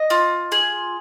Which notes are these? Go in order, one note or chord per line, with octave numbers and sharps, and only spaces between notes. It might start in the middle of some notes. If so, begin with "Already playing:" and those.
Already playing: D#5
F4
G#4